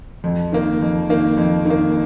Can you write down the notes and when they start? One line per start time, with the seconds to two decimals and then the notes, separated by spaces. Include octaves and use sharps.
0.24 F2
0.52 D#3 A#3
0.81 F2
1.09 D#3 A#3
1.37 F2
1.65 D#3
1.70 A#3